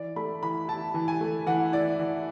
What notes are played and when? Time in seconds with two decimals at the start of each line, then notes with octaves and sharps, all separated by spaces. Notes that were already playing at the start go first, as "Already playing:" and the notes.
Already playing: E3 D5
0.16 A3 B5
0.43 E3 B5
0.68 E4 A5
0.94 E3
1.08 G#5
1.21 A3
1.47 E3 F#5
1.72 E4 D5
1.99 E3